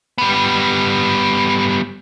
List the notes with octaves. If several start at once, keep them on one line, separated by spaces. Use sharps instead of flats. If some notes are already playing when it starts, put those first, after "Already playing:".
G3 B3